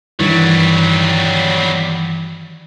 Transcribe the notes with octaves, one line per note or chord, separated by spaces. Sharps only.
G2 D#3 E3 F#3 G3